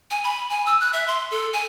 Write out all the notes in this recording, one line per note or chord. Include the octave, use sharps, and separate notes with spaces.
G#5
B5
G#5
E6
F#6
E5
C6
A4
G#5